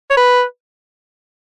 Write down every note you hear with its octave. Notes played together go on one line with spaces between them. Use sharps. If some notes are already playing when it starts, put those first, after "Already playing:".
C#5
B4